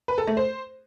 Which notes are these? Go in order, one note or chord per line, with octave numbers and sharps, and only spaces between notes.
B4
A4
A3
C5